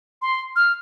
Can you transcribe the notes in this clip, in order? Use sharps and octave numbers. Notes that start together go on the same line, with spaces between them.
C6
F6